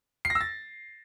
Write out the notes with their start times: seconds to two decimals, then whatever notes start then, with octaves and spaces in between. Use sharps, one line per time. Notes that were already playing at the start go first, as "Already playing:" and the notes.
0.25 C7
0.30 A#6
0.35 E6
0.41 A6